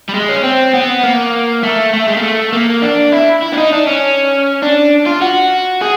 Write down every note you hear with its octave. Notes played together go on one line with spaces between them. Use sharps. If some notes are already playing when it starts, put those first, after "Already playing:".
G3
G#3
C#4
C4
B3
A#3
A3
A3
G#3
A#3
A3
A#3
D4
E4
E4
D4
D#4
D4
C#4
D4
F4
F#4
G#4